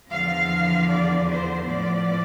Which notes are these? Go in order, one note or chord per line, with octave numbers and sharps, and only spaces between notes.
E2 D3 F3 F5
D5
C5
A2 F3 B3 D5